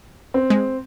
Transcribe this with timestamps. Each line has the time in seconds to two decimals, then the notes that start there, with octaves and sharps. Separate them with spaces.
0.34 C4
0.50 G#3